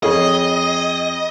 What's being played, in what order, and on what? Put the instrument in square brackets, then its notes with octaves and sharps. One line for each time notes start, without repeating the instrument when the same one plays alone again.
[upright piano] F2 G#4 C#5 [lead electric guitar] D#5